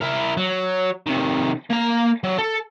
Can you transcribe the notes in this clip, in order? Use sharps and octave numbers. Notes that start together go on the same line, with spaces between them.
E4 A#4
F#3
C3 D#3
A#3 A#5
F#3
A4